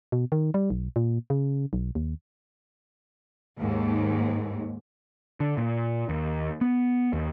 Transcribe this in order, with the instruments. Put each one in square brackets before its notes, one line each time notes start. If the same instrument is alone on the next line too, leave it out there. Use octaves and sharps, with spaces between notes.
[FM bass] B2
D#3
G3
B1
A#2
C#3
B1
D#2
[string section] D#2 G#2
[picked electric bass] D3
A#2
D#2
B3
D#2